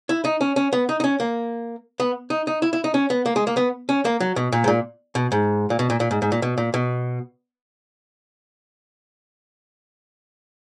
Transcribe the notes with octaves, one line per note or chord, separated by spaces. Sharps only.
E4
D#4
C#4
C#4
B3
D#4
D#4
C#4
A#3
B3
D#4
D#4
E4
E4
D#4
C#4
B3
A#3
G#3
A#3
B3
C#4
A#3
F#3
B2
A#2
G#2
A#2
B2
G#2
A#2
B2
A#2
A#2
G#2
G#2
A#2
B2
A#2
B2